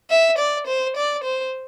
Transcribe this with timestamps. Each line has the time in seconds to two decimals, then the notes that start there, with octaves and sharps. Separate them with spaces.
0.10 E5
0.38 D5
0.67 C5
0.97 D5
1.24 C5